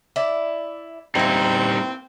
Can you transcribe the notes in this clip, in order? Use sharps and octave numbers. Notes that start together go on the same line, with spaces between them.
E4 D5
E3 G3 A#3 C4 D#4